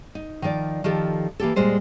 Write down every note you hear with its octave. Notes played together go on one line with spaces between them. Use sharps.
D#4
D#3 F3 D#4 D5
D#3 F3 G4 A4
E3 A#3 G4 A4
A#2 G3 G#3 C5 G#5